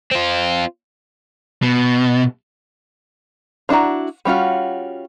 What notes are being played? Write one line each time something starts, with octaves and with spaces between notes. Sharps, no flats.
C4 F4
B2
F3 D4 E4 F#4 A#5
G3 C#4 F4 F#4